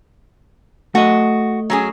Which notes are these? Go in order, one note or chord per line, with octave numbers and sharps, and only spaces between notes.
A3 F#4 D#5
F#3 C#4 G#4